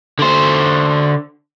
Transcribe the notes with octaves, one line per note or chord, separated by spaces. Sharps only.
D3 C5